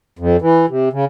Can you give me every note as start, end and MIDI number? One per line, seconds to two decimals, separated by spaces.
0.19 0.37 41
0.42 0.66 52
0.69 0.89 48
0.93 1.05 49